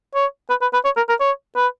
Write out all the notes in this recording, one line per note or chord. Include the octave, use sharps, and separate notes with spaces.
C#5
B4
B4
B4
C#5
A#4
A#4
C#5
B4